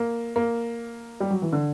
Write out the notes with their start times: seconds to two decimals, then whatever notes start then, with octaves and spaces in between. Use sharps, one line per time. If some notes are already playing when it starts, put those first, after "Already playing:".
Already playing: A#3
0.36 A#3
1.20 G3
1.30 F#3
1.42 E3
1.53 D3